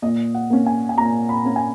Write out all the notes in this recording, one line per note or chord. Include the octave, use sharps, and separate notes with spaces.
A#2 D#5
F#5
A#3 C#4
G#5
G#5
A#2 A#5
B5
A#3 C#4
G#5